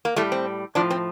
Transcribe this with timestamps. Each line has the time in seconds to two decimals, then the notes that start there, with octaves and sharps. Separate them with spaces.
0.05 A#3
0.16 A2 G3 A3
0.32 C4
0.75 A2 F3 D4
0.90 C4